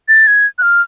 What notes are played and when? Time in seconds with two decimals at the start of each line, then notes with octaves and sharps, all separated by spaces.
0.08 A6
0.27 G#6
0.58 F#6
0.62 F6